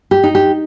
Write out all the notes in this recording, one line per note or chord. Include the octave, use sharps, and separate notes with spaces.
G4
D#4
G4